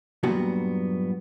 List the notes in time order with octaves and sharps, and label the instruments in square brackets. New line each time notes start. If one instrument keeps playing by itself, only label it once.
[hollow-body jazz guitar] G2 A#2 F#3 G3 B3 F#4